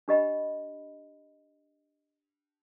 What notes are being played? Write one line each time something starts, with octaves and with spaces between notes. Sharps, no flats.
D4 G4 D#5 B5